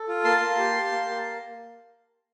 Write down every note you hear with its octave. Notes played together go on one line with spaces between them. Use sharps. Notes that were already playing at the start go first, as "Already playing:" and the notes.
Already playing: A4
F4
A#3 A5 C6
A#3
G4
G4
A#3
A#3